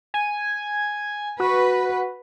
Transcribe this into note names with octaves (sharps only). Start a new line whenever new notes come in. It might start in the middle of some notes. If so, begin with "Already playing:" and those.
G#5
F#4 B4